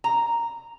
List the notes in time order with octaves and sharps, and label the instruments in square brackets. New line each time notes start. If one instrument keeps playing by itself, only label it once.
[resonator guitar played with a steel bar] A#5